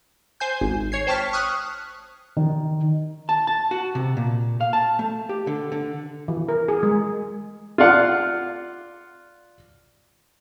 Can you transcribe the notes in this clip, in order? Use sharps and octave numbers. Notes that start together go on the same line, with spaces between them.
C5 G#5 G6
G#1
C#5 G#6 C7
C5 G5 A5 C#6 F6 B6
C#6 D#6 F6 F#6
D#3
A5
A5
F#4
C3
A#2
F5
A5
A3
G4
D3
D3
E3
A#4
G#4
G#3
F4 D5 F5 F#5